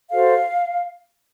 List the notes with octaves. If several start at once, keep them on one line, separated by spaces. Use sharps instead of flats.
F#4 A4 C5 F5